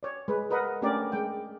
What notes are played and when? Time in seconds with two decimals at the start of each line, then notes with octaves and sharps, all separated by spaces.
0.03 C#5 D5
0.28 G#3 B4
0.51 A#4 B4 D#5 F#5
0.82 A3 C#4 D4 G4 A#4 D5
1.12 G#3 G5